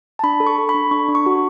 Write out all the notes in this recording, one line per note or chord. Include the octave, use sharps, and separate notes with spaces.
A5
D4 B5
A4
C#6
A4
B5
D4
D4 C#6
D4
C#6
F#4